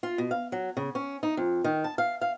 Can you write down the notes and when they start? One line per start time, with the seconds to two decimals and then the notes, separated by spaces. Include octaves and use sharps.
0.03 F4
0.18 B2
0.31 F5
0.52 F#3
0.77 C#3
0.95 C#4
1.23 D#4
1.37 F2
1.64 D#3
1.84 A5
1.98 F5
2.21 F5